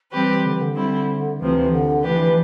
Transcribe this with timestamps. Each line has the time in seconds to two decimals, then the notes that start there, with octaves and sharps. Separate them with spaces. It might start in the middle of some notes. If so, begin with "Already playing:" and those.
0.12 E3 G3 C4 G4 B4
0.43 D3
0.52 E3
0.60 D3
0.75 G3 C4 E4
1.39 D2 C3 E3 F3 C4
1.71 D3
2.03 E3 F3 A3 D4 G4 B4